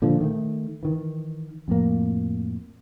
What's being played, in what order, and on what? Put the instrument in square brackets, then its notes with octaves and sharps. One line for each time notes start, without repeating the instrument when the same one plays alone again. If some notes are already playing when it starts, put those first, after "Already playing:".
[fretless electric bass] A#2 D3 F3
D#3 A3
D#3 E3
F2 A2 A#3